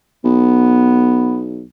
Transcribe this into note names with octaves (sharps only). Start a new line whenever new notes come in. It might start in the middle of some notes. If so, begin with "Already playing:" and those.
B1 B3